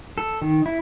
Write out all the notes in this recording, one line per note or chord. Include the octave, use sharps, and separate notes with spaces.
A4
D#3
E4